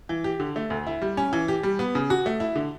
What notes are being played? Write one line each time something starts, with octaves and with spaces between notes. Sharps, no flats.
E3
G4
D3
A3
D2
E4
G3
C#4
E3
G4
G3
B3
C#3
F#4
A3
E4
D3